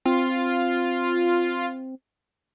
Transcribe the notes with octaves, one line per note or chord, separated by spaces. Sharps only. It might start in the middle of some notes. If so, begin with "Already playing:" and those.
C4 F4